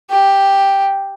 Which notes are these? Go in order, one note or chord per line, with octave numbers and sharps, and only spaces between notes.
G4